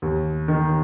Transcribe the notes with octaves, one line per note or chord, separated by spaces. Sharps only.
D#2
D#3